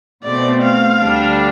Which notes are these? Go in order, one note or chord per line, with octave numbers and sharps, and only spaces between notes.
B2 A3 C4 D5
F5
D2 D3 G3 D4